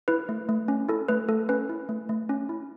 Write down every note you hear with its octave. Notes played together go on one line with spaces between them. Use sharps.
E4 B4
A3
A3
C#4
E4 A4
A3 B4
A3 A4
C#4 B4
E4
A3
A3
C#4
E4